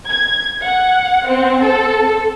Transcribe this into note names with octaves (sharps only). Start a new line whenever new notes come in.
G#6
F#5
C4
A4